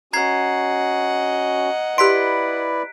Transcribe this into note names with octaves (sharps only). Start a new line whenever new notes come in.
C#4 F#4 D#5 F#5 A#5 G#6 C7
E4 G4 B4 D5 C6 F#6 B6 D7